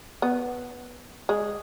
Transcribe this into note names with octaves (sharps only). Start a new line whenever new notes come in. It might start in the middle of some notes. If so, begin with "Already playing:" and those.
B3
G#3